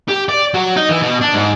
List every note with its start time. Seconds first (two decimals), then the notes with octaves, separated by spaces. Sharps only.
0.09 G4
0.29 D5
0.54 F#3
0.76 D#4
0.89 E3
1.01 B2
1.21 D4
1.34 G#2